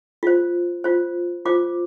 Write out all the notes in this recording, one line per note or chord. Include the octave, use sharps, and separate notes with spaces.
F4 C5
F4 C5
F4 C5 D6